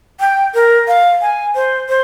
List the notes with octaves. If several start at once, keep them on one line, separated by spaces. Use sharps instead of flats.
G5
A#4
F5
G#5
C5
C5